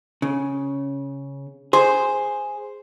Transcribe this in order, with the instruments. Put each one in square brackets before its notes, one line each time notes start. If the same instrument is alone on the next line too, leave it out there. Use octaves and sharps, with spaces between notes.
[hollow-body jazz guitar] C#3
[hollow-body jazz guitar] G#4 [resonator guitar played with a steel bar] C5